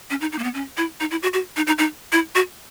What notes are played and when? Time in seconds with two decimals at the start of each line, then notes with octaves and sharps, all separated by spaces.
0.10 C#4
0.21 D#4
0.33 D#4
0.39 A#3
0.44 B3
0.54 C#4
0.77 E4
1.00 D#4
1.11 E4
1.23 F#4
1.33 F#4
1.57 D#4
1.67 D#4
1.78 D#4
2.12 E4
2.35 F#4